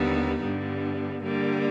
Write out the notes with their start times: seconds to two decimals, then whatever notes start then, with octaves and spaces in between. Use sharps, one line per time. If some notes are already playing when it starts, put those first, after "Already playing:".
Already playing: D#2 D3 G3 B3 D#4
0.42 G2 D3 G3 B3
1.22 D3 G3 A#3